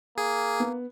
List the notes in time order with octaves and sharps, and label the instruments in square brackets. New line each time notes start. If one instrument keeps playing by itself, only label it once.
[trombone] A#3 [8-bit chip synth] G#4
[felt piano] B3